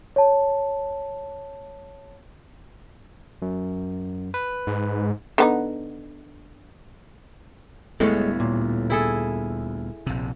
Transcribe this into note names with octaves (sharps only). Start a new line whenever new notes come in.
C#5 A5
F#2
B4
G#2
D3 B3 D#4
D2 A2 G3 G#3 B3 C#5
A#2
E4 G#4 A4
A#1 C3